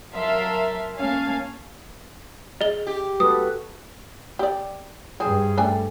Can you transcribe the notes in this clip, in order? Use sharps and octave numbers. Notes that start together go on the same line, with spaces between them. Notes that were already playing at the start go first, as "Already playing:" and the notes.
F#3 A#4 E5 F5 A5 C6
A#3 C#4 F5 G#5 A5
G#4 D#5 G7
G4
F#4 A4 B4 D#6
G4 D5
G2 C4 G#4
A3 D4 G5 G#5